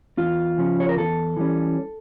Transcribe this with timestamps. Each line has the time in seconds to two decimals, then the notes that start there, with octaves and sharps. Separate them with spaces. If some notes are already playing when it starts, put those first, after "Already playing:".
0.18 E2 F4
0.58 C#3 F3 C#4
0.80 C#5
0.89 A#4
0.97 E2 A4
1.37 E3 G3 C#4